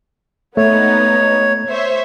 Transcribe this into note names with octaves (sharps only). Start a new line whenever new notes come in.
A3 B3 D#4 C#5
C5 C#5 E5